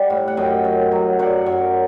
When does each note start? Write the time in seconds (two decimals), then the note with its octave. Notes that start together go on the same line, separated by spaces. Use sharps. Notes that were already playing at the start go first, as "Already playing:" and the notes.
Already playing: G3 D5 F#5
0.10 A2
0.28 F#5
0.37 F#2 D#5 G5
0.65 F#2
0.92 F#3
1.19 F#2 D5 F#5
1.46 F#2